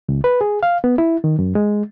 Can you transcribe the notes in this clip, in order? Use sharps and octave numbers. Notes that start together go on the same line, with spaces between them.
C#2
B4
G#4
F5
B3
E4
D#3
F#2
G#3